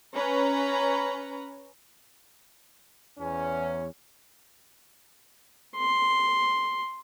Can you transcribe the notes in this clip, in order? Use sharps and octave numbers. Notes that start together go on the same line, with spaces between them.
C#4 B4 A#5
E2 C#4
C6